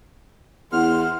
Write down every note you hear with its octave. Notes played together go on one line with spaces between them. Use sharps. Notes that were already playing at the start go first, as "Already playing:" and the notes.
E2 F#5 C6 F6